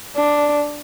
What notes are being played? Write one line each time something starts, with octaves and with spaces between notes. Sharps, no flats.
D4